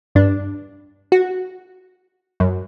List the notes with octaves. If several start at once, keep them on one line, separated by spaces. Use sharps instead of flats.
G2 D4
F#4
F#2